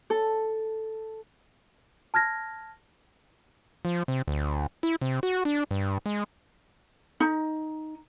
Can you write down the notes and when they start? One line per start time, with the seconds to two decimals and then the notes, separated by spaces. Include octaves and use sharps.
0.10 A4
2.14 A5 F6 G#6 A#6
3.85 F3
4.08 C3
4.28 D2
4.83 E4
5.01 C3
5.23 F#4
5.45 D4
5.71 G2
6.06 G#3
7.20 D#4